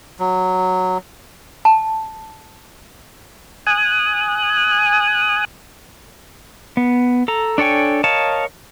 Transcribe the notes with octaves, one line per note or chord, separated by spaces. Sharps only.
F#3
A5
G#5 D#6 F#6
B3
A4 A#5
D4 A4 C#5 G5 G#5
A#4 C#5 D#5 F5 A5